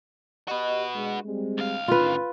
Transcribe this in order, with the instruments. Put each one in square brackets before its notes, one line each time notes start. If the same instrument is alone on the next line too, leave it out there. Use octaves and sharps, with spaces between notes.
[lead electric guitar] F#4 B4 [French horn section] G4 D#5
[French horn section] G#3 D4
G3 G#3 C4
[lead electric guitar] D2 F5
[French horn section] A2 D#3 C#4 [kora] F4 B4